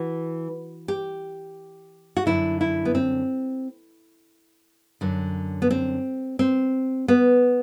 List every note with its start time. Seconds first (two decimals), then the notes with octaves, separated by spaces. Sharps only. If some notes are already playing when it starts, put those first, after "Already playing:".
Already playing: E3 F#4
0.88 G4
2.17 F#4
2.26 F#2 D3 E4
2.61 E4
2.85 B3
2.95 C4
5.01 F#2 D3
5.62 B3
5.71 C4
6.39 C4
7.08 B3